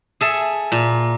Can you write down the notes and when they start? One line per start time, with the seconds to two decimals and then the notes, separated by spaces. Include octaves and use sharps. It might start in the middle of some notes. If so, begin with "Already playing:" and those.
0.21 G#4 A4 E5
0.72 A#2